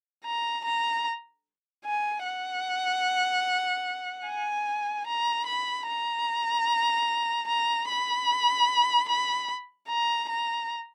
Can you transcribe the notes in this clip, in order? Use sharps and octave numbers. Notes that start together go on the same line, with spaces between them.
A#5
A#5
G#5
F#5
G#5
A#5
B5
A#5
A#5
B5
B5
A#5
A#5